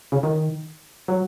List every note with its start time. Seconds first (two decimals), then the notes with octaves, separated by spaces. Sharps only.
0.12 C#3
0.23 D#3
1.08 F#3